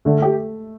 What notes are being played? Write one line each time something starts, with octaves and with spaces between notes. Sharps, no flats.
D3 A3
G4